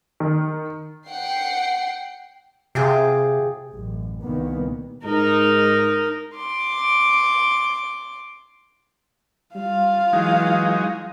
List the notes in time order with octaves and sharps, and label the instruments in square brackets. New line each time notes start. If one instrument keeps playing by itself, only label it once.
[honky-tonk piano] D#3
[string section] F#5 G5 C7
[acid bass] C3 [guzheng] F4 G4 G#4
[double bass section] A1 F#2
C2 A#2 D#3 A#3 B3
[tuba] G#2 [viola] D#4 A#4
[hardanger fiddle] C6 D6
[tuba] G3 [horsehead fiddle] F4 F5
[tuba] E3 [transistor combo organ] F#3 G#3 D#4